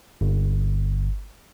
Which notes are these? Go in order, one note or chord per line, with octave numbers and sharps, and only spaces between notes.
G1